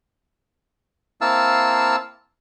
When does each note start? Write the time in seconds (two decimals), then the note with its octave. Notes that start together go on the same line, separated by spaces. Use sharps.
1.21 A#3 C4 E4 F5 A5 E6